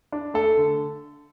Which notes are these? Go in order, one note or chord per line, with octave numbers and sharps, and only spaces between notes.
D4
A3 A4
D3